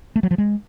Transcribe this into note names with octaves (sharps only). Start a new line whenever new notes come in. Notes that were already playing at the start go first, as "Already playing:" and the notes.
A3
F#3
F3
G#3